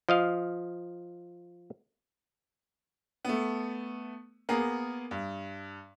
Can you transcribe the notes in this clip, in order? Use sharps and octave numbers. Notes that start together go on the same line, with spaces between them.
F3 D#5 F5
A3 B3
A#3 B3 G#4 A#4
G2